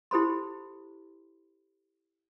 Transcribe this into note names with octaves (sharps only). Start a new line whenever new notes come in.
E4 G4 A4 C5 B5 C6